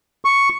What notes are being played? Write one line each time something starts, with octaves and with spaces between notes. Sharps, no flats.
C#6